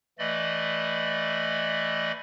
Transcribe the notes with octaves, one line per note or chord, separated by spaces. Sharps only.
E3 A3 D5 D#5 B5